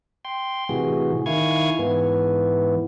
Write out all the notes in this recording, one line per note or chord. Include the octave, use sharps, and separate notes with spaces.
G5 C6
A2 C3 E3 F#4 G#4
D#3 E4 F5 G#5 C#6 G#6
G#2 E3 B3